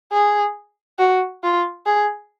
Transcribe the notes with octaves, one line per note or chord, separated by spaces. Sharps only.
G#4
F#4
F4
G#4